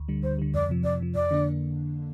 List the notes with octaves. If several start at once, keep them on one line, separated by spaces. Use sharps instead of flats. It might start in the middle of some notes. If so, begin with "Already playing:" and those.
Already playing: D2
D3 G3
D2 C5
D3 G3
F2 D5
C3 F3
F2 D5
C3 F3
F2 D5
D3 A#3 D4